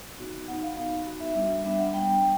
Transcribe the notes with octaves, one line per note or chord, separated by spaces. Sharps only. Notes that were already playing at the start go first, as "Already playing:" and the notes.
B3 D#4 F#4
B3 D#4 F#4 F#5
F5
B3 D#4 F#4
B3 D#4 F#4
E5
G3 B3 D4 E5
G3 B3 D4 E5
F#5
G3 B3 D4 G5